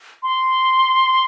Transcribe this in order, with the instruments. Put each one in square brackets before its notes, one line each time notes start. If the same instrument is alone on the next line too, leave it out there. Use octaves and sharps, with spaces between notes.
[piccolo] C6